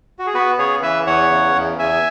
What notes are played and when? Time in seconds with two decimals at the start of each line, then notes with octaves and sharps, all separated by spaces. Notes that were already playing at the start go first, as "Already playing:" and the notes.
0.19 F#4
0.26 G#4
0.34 B3 F#4 B4
0.59 C#3 G#4 C#5
0.82 E3 B4 E5
1.07 E2 C#5 F#5
1.31 C#3
1.55 E2
1.79 E2 E5 G#5